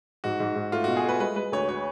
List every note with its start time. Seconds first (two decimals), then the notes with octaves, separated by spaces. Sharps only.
0.24 G#2 F#4
0.40 G#2
0.56 G#2
0.72 A3 F4
0.84 B2 F#4
0.97 G#4
1.04 A3 B4
1.20 G#3 B4
1.36 G#3 B4
1.52 D2 C#5
1.68 F#4 C#5